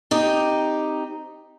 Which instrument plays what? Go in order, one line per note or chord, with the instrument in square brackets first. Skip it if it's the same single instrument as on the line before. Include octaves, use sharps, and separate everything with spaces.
[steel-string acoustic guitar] C4 D#4 G4